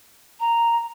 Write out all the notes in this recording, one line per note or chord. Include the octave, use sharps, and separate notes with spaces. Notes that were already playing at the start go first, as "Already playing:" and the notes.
A#5